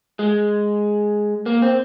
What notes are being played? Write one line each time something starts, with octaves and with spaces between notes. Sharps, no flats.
G#3
A#3
C4